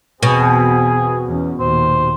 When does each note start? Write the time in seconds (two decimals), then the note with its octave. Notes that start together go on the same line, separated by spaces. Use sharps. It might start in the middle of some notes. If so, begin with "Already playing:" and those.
0.23 E2 B2 C4 G#4
1.26 E2 C#4
1.60 D#2 A#2 C5